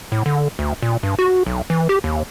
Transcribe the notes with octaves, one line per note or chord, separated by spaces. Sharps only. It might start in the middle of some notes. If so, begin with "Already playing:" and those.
A2
D3
D2
A#2
G2
F#4
B1
E3
G4
D#2